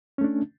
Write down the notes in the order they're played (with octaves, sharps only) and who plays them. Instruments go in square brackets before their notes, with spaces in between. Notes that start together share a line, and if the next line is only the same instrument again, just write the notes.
[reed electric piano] C#4
A3
D4